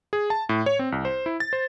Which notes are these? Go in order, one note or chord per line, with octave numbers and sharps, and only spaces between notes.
G#4
A5
A2
C#5
C4
C2
C5
E4
A6
C5